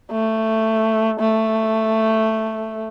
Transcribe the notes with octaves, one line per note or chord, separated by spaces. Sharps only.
A3
A3